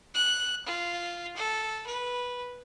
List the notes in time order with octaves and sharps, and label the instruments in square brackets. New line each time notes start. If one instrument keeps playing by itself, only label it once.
[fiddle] F#6
F4
A4
B4